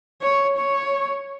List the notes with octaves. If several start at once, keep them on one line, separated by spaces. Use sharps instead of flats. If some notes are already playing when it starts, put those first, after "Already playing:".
C#5
C#5